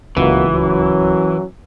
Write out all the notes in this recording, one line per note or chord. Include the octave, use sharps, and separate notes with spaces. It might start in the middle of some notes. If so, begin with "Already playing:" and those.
D1 C#2 B2 E3 A#3 F#4
F#2 F#3 C#4